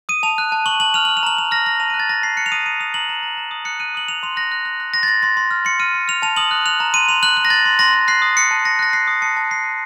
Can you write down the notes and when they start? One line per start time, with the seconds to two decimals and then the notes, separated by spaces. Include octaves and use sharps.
0.09 D#6 D#7
0.23 A5 F7
0.38 F#6
0.52 A5
0.66 C#6 F#7
0.80 A5 F#7
0.94 F6 F7
1.05 F6 F#7
1.17 F7
1.23 A#5 F#7
1.37 A#5 F7
1.51 F6 A#6
1.66 F6 A#6
1.80 A5 F7
1.90 F#6 D#7
2.00 A6
2.09 A5 A#6
2.23 A5 C7
2.37 F#6 C#7
2.46 F7
2.52 D#6 D#7
2.66 A#5 D#7
2.80 D#6 F7
2.94 A#5 F#7
3.09 A#5
3.23 A#5
3.37 A#5
3.51 D#6
3.65 F#6 C#7
3.80 F#6 D#7
3.95 D#6 F#7
4.08 F#6 F7
4.23 C6 F7
4.36 F#6 A#6
4.52 F#6
4.65 F#6
4.80 F#6
4.94 C6 A#6
5.03 A6
5.08 C6 A#6
5.23 C6 A6
5.37 C6
5.51 F6
5.65 C6 C#7
5.80 F6 D#7
5.95 C6
6.08 F6 F7
6.22 A5 F7
6.36 D#6 F#7
6.51 F#6
6.65 F#6 F7
6.80 A#5
6.94 C6 D#7
7.09 C6 F7
7.23 F#6 F#7
7.37 F#6
7.45 A#6
7.50 C6 A6
7.65 C6
7.79 C6 A#6
7.94 C6
8.08 F#6 C7
8.22 D#6
8.37 F#6 C#7
8.51 A5
8.65 D#6 A#6
8.79 F#6 A#6
8.93 F#6 C7
9.07 D#6
9.22 A5 C#7
9.37 A5
9.51 A5 C7
9.64 A5